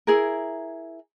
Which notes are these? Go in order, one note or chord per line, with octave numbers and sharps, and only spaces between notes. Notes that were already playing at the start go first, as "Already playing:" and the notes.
E4 G#4 A#4